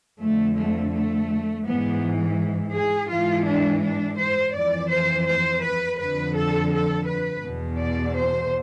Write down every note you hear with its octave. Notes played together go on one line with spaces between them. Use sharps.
F2 D3 A3
A3
A3
G#2 E3 B3
G#4
G#2 E3 F4
D4
D4
C5
F2 E3 D5
C5
C5
B4
F2 D3 B4
A4
A4
B4
E2 B2
D5
C5